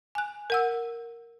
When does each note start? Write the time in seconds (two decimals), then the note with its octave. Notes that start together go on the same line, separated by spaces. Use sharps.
0.15 G#5 F#6
0.50 A#4 F#5 E6